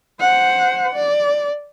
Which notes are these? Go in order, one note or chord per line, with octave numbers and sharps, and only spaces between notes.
C5 F#5
D5